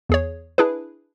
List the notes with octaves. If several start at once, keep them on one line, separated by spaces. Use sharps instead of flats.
E2 G#4 C#5
D4 E4 G#4 B4